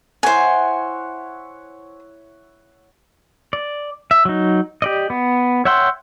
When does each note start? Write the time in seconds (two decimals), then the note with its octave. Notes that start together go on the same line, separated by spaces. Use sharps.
0.23 E4 C5 C#5 F#5 G#5
3.53 D5
4.11 E5
4.25 F#3 D#4
4.82 G4 D5 D#5
5.10 B3
5.65 C#5 E5 F#5 G5 C6